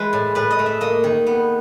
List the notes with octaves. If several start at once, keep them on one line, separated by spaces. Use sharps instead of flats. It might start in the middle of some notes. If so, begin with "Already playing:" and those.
Already playing: E3 G#3 B4
A2
A2 B4
D#5
A3
E5
A#3 D#5
D#3
B3